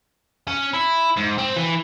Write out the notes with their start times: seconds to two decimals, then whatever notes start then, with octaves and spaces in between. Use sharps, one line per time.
0.47 C#4
0.74 E4
1.17 G#2
1.38 C4
1.56 E3